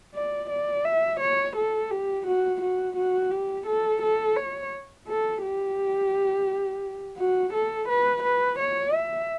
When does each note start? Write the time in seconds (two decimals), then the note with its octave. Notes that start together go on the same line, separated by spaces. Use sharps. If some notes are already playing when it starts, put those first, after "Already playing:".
0.14 D5
0.50 D5
0.85 E5
1.20 C#5
1.56 A4
1.91 G4
2.27 F#4
2.62 F#4
2.97 F#4
3.31 G4
3.66 A4
4.02 A4
4.36 C#5
5.08 A4
5.42 G4
7.18 F#4
7.54 A4
7.89 B4
8.23 B4
8.59 C#5
8.94 E5